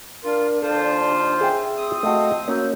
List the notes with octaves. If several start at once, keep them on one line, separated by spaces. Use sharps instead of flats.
D4 F4 A#4
D#2 F4 A4 C5 A5
G#4 E5 G5
C4 D#6
A3 F#4 D#5 F5 G5 A5
A#3 C#4 F#4 E6 G6